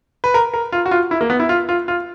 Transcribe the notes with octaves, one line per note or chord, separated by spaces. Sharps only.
B4
A#4
A#4
F4
F#4
F4
E4
A#3
B3
E4
F4
F4
F4